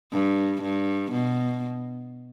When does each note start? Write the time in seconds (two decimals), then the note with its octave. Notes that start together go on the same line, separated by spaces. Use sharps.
0.12 G2
0.62 G2
1.12 B2